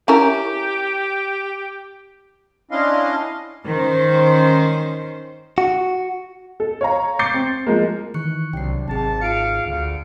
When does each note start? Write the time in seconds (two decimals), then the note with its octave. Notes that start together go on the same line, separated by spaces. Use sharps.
0.08 C#4 E4 G4 A#4
2.71 C#4 D4 E4 D#5 F5 C6
3.66 D#3 C#4 C5
5.58 F#4
6.60 A4
6.81 C#5 F5 A#5
7.19 D6 G6 A6 C7 C#7
7.34 C4
7.67 F3 G#3 A#3
8.14 D#3 E3 C#6 F#6 C#7
8.53 C2 C3 F#3 D4 G5 C7
8.88 G#1 C4 G#4 A5
9.21 F4 G#4 F5 C#7 D7
9.66 D2 F5